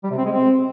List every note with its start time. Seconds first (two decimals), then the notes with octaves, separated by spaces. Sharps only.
0.04 G3
0.11 C3
0.18 C4
0.25 G#3
0.32 C4